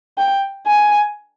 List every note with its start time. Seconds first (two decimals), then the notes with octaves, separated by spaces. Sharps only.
0.18 G5
0.66 G#5